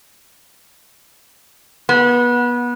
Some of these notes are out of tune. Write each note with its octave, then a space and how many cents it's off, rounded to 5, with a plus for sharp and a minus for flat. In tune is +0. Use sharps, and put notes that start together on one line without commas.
B3 -25